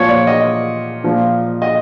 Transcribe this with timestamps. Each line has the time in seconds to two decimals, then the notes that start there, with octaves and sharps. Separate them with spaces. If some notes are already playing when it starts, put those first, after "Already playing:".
Already playing: A#2 F3 C#5
0.09 D5
0.27 D#5
1.04 A#2 F3
1.62 D#5